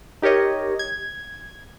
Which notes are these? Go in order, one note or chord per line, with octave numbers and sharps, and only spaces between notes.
D#4 G4 A#4 C#5 D#5
G#6